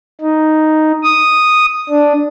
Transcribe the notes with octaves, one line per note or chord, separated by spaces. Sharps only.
D#4
D#6
D4